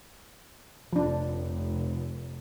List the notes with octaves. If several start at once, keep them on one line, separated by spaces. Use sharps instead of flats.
F1 F3 D4